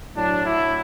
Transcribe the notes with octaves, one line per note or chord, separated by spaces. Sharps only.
A2 F#3 D4
E4